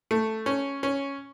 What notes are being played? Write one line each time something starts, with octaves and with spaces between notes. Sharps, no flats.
A3
C#4
C#4